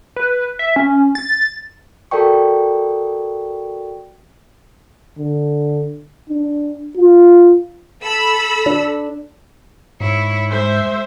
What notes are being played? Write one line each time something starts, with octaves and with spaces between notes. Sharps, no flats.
B4
E5
C#4
A6
F#4 A4 A#4 D5 G5 C#6
D3
D4
F4
A4 B5 E6
D4
G#2 E4 C#5
G#3 C5 E5